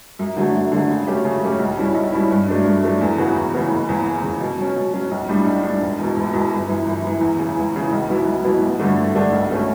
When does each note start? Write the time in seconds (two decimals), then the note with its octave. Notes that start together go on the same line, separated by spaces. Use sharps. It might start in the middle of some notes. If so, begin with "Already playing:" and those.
0.19 F#2
0.37 D3 F#3 A3
0.55 F#2
0.72 D3 F#3 A3
0.90 C#3
1.07 F#3 A3 C#4 G4
1.25 C#3
1.42 F#3 A3 C#4 G4
1.59 B1
1.77 B2 G3 C#4 E4
1.95 B1
2.12 B2 G3 C#4 E4
2.30 G2
2.48 F#3 A3 D4
2.65 G2
2.83 F#3 A3 D4
3.01 E2
3.18 C#3 E3 B3 F#4
3.35 E2
3.54 C#3 E3 B3 F#4
3.71 F#1
3.89 E2 C#3
4.05 F#1
4.23 E2 C#3
4.40 B2
4.58 F#3 C#4
4.76 B2
4.93 F#3 C#4
5.11 B1
5.29 A2 G3 D4
5.46 B1
5.63 A2 G3 D4
5.81 E1
5.99 E2 B2
6.16 E1
6.33 E2 B2
6.52 G1
6.69 F#2 E3
6.86 G1
7.04 F#2 E3
7.21 E2
7.39 C#3 E3
7.57 E2
7.74 C#3 E3
7.92 B1
8.09 B2 F#3 B3 E4
8.26 B1
8.44 B2 F#3 B3 E4
8.62 A1
8.79 G2 D3 A3 D4
8.97 A1
9.15 G2 D3 A3 D4
9.33 B1
9.50 B2 A3 C#4